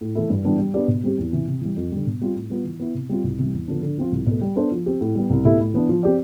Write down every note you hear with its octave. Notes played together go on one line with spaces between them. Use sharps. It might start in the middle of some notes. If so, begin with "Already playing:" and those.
A2
E3 A3 E4
G2
E3 G3 B3 D4
G3
B3 D4 G4 D5
B2
G3 C4 G4
E2
C3 E3
C3
E3 G3
F2
D3 G3
B2
G3 C4 F4
A2
G3 B3 F4
E3
B3 E4
C3
G3 C4 F4
C2
C3 E3 G3
E2
D3 F3 B3 D4
D3
F3 C4 F4
C2
B2 A3
G3
B3 D4 A4 C5
F3
C4 G4
A2
G3 B3
C2
B2 A3 E4 G4
A2
E3 B3 D4
F3
C4 G4 D5